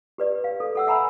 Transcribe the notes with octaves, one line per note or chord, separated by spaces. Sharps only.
G4 B4 D5
F5
A4
A4 F#5 E6
E5 F#5 G#5 A#5 B5 E6